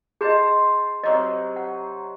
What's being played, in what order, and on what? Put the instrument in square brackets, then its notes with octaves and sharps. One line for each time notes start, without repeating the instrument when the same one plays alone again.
[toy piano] G#4 D#5 [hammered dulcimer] C5 A5 C6
[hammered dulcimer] C3 F#3 D#4 [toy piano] D#5
[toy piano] F#5